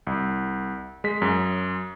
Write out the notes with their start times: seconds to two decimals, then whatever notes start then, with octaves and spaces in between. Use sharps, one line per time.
0.07 C2
1.04 G#3 B6
1.22 F#2